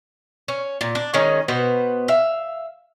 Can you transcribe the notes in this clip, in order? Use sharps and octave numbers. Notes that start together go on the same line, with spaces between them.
C#4
A#2
D4
D#3 G#3 C#4 D#4
B2 B3 B4 C5
E5 F5